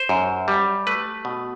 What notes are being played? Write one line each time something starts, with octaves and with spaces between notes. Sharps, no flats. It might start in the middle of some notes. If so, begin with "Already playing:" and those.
Already playing: C5
F#2
G3
A3 B4
B2